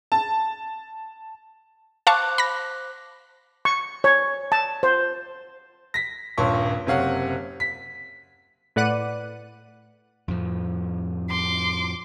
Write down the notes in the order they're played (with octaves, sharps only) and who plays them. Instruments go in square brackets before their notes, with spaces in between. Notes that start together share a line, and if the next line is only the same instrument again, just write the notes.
[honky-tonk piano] A5
[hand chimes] C5 D6 F#6 [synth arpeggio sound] F5 A5 C#6
[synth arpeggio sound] B5 A#6
[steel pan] C#6
C#5
A5
C5
[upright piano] A#6 B6
D#1 G2 C#5 C6 C#6
F#1 C3 C#5 F5 F#5
B6
[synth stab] A2 B4 D5 F#5 F#6 D#7
[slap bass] F2 A2 F3
[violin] C6 D6